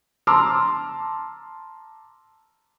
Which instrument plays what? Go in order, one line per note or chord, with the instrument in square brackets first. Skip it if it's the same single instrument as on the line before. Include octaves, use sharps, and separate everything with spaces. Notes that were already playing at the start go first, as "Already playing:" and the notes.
[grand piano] A5 A#5 C6 D6 E6 F6